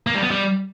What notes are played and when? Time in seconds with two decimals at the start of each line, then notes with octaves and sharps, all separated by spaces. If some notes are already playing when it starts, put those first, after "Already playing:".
0.07 A#3
0.15 G3
0.23 B3
0.30 G3